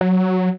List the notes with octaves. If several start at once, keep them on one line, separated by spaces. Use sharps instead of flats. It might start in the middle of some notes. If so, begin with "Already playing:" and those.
F#3